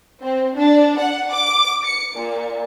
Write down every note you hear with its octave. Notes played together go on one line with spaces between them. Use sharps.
C4
D4
F#5
D6
C#7
A#2